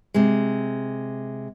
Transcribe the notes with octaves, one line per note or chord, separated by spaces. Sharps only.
C3 G#3